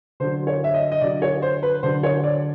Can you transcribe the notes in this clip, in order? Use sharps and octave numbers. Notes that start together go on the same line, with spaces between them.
D3 F#3 C5
C#5
E5
D#5
D#5
D3 F#3 D5
C#5
C5
B4
D3 F#3 C5
C#5
D5